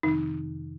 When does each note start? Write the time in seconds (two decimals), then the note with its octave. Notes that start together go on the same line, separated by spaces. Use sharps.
0.03 F2 C3 D#3 D#4